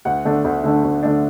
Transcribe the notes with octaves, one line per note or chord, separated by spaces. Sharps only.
D2 F#5
D3 A3 D4
D2
D3 A3 D4
D2
D3 A3 D4